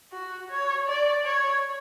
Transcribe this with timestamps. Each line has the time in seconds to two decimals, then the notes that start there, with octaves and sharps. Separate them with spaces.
0.12 F#4
0.50 C#5
0.88 D5
1.26 C#5